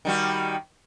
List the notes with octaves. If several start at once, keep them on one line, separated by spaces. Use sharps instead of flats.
D#3 G3 F#4